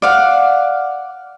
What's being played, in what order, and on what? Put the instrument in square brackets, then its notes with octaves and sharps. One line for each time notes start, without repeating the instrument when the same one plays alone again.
[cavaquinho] D5 F5 F#5